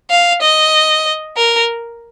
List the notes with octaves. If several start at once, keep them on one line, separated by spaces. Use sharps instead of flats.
F5
D#5
A#4